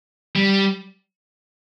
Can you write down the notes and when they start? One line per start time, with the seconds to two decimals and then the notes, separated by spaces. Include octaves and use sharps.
0.36 G3